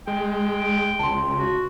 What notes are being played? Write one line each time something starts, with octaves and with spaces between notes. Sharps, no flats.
G#3 G5
C#2 A5 C6
F#4